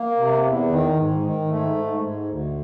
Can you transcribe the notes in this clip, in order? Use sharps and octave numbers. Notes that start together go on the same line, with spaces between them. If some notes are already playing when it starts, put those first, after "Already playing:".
Already playing: A#3
C3
E2
D#3
G#2
D#3
G#2 A3
G#2
G#2
D2